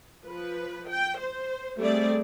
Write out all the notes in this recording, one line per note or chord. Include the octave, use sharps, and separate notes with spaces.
F3 B4
G5
C5
G3 A3 C4 G#4 D5